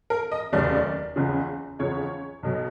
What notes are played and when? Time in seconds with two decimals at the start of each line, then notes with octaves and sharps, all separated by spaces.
0.10 A#4
0.32 D#5
0.53 F1 D#2 C#3 F#3 D5
1.16 F#1 E2 C#3 F3
1.79 F#1 E2 C#3 F3 C#5
2.43 B1 B2 F#3